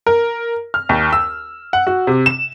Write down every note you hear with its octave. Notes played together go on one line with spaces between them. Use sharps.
A#4
F6
D#2
E6
F#5
F#4
C3
E7